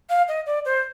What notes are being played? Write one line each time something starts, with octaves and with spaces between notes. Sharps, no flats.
F5
D#5
D5
C5